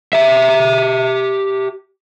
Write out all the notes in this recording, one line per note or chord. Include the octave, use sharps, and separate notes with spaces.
G4 E5